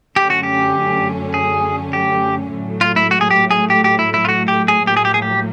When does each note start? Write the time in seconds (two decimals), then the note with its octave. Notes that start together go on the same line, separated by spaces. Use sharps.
0.16 F#2 D3 F#3 A3 C#4 G4
0.30 F#4
0.43 G4
1.34 G#4
1.93 G4
2.52 A2 F#3 A3
2.81 F4
2.96 E4
3.11 F#4
3.21 G#4
3.31 G4
3.51 G#4
3.70 G4
3.84 G4
3.99 E4
4.14 E4
4.25 F4
4.29 F#4
4.48 G4
4.68 G#4
4.87 A2 F#3 A#3 G4
4.97 G#4
5.05 G4
5.14 G#4
5.22 G4